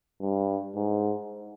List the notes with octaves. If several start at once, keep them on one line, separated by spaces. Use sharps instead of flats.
G2
G#2